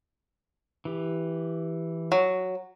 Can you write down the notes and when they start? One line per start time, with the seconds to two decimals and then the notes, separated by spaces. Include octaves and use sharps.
0.85 E3 G4
2.12 F#3